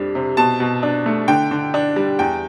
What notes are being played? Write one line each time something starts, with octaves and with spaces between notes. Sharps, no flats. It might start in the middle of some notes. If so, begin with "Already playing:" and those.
Already playing: F2 G3 D4
C3
B2 A5
B2
D4
A3
D3 G5
D3
D4
G3
E2 G5